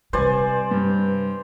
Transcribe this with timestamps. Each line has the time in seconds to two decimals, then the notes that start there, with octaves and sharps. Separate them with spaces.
0.13 C3 G3 B4 C5 D5 G#5
0.71 G2